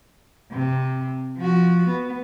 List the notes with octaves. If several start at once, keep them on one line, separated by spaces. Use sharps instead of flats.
C3
F3 F#4
B3